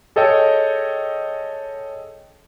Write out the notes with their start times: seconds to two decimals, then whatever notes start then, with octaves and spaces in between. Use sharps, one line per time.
0.16 G#4 A4 C#5 D#5 G5